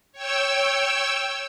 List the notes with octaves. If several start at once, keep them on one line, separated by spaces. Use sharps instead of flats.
C#5 G5 E6